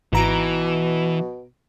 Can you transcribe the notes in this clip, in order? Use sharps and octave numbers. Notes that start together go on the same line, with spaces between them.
G#1 B2 E3 A#5 D7